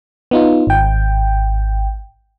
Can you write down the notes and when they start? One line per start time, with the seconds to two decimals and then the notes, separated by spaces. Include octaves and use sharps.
0.31 B3 D#4 F4
0.67 G#1 G5